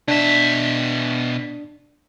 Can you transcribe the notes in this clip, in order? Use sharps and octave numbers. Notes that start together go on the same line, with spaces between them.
B2 D4 E5